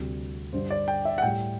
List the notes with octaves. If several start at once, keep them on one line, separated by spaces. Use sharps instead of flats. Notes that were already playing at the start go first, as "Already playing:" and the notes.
Already playing: D2 C3 G3
G2 D3 G3 C5
D5
G5
E5
F#5
A2 G3 G5